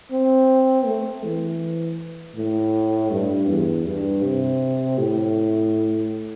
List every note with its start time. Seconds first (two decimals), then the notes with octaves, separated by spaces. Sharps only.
0.12 C4
0.86 A3
1.24 E3
2.36 A2
3.11 G2
3.49 E2
3.86 G2
4.23 C3
4.98 A2